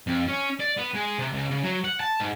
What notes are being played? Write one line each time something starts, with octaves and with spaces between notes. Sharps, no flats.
F2
C#4
D5
B3
G#3
C3
C#2
C#3
F#3
F#5
A5
G#2